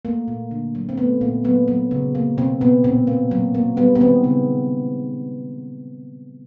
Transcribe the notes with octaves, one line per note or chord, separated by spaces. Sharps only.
A3 A#3
A#2
D3
F#3
C4
A3 B3
A#2 A#3
F#3 B3
F#3
C#3
A#3
B2 C4
B2 B3
A#2 C4
A#3
F#3
A#3
G3 B3
B3
D#3 C4
C#3